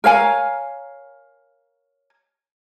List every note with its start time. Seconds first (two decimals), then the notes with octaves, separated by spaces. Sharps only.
0.04 A#4 C#5 F5 G#5